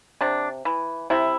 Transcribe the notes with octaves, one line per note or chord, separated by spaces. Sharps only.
C3 D4
E3
C3 E4